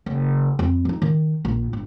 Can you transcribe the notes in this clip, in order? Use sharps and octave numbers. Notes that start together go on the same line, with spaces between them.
F#1
F2
F3 D#4
D#3
A#1
G1